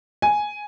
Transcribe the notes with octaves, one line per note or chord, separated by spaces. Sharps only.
G#5